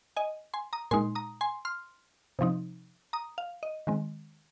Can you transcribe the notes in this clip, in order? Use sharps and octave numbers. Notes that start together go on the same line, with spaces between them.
D#5 G#5
G#5 C6
A#5 D#6
A#2 G#3 D#4 G#5 C6
A#5 D#6
G#5 C6
C6 F6
C3 F3 C4 D#4
A#5 D#6
F5
D#5
D#3 G#3 C4